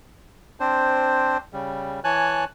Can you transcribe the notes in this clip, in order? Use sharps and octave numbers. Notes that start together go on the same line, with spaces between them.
C4 D4 C5
C#3 G3
E3 C#5 G#5 A5 F#6